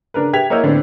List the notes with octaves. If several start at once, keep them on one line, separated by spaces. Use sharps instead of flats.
C#3 D4 A#4 B4
G4 B4 E5 G#6 B6 F7
A#3 E4 C#5 D#5 E6 G6
A2 D3 B3 C4 D4